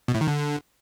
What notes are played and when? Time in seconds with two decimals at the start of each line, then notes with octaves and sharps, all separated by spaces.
0.08 B2
0.15 A2
0.21 D#3
0.27 D3